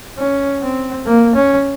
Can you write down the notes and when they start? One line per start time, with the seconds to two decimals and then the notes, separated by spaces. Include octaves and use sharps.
0.18 C#4
0.62 C4
1.06 A#3
1.35 C#4